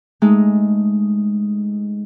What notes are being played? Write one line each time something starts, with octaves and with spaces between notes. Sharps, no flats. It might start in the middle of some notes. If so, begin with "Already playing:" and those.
G#3 A3 D#4